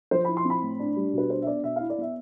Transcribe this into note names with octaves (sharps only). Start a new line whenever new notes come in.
F3 C5
E4 B5
C6
C4
B5
A2
D4
G3
B2
B4
D4 C5
E5
B3 D5
B2 E5
F5
E4
D5
B3 E5